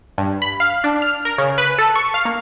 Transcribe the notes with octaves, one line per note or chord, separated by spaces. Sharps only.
G2
B5
F5
D4
F6
A#4
C#3
B4
A4
C#6
F5
A#3